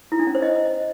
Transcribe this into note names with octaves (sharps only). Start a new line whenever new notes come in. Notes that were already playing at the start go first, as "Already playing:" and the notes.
E4
D4
C#4
C5
D#5